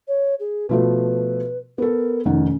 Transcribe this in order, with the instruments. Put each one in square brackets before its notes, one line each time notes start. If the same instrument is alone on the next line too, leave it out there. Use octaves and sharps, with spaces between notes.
[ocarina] C#5
G#4
[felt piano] B2 F3 A3 [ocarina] B4
[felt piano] B3 A4 [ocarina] A#4
[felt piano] F1 D#3 F#5 [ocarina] C#4